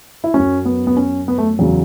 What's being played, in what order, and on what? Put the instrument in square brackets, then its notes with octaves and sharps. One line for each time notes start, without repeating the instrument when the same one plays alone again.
[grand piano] E4
F#2 F#3 C#4
B3
B3
C#4
B3
A3
E2 C#3 F#3